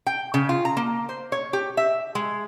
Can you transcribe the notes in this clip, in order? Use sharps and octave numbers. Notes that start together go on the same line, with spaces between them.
G5
C#3
F4
A#5
A#3
C5
C#5
G4
E5
G#3